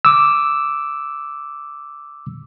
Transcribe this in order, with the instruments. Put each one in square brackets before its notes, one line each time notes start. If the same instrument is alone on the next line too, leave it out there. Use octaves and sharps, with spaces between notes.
[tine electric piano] D6 E6